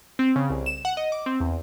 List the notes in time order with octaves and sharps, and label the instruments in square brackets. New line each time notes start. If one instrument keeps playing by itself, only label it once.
[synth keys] C4
C#3
C2
E7
F#5
D#5
D6
C4
E2